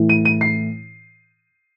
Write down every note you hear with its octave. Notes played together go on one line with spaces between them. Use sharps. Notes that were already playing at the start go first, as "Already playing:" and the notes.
Already playing: A2 E3
D#7
D#7
C7